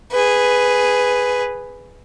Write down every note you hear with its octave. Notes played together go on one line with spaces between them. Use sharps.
G#4 B4